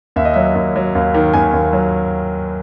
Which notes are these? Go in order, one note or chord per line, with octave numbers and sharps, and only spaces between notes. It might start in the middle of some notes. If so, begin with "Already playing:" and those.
D#2 E5
D#5
F#3 E5
D#2
F#3
D#2
D#3
D#2 G#5
D#2
F#3